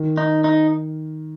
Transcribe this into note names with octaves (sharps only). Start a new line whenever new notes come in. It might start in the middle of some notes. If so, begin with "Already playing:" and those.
Already playing: D#3
D#4
D#4